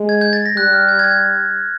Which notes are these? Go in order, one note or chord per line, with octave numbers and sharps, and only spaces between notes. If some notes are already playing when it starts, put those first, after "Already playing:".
Already playing: G#3
G#6
G6
A6
A#6
G3 F#6
F6
G6
G#6
G6